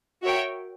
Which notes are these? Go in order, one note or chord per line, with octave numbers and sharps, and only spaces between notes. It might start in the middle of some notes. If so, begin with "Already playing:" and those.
F#4 A#4 C#5 E5 G5